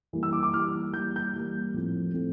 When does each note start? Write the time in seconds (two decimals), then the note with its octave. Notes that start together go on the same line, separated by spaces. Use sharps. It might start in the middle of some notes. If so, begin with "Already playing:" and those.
0.13 E3 G3 A#3
0.23 E6
0.33 D6
0.43 D6
0.53 E3 G3 A#3 F6
0.93 E3 G3 A#3 G6
1.16 G6
1.33 E3 G3 A#3
1.74 A2 F3 A3 C4
2.14 A2 F3 A3 C4